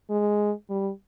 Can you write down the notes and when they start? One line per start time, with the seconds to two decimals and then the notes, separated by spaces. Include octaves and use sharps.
0.10 G#3
0.70 G3